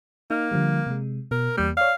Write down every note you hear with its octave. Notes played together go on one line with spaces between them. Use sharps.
A#3 D#4 F6
D3 F3 G3
C3 G#3
B2 A#4
E2 G3 A#3
C#5 D5 F5